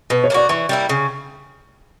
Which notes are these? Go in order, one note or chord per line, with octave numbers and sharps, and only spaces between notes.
B2 B4
C#5
A#3 D4 F#4 D5
E3 C#6
G3 A#3 E4
C#3